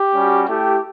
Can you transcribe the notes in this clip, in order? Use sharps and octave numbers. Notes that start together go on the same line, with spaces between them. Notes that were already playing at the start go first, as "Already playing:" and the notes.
Already playing: G4
G3 C#4 F#4
A3 E4 G4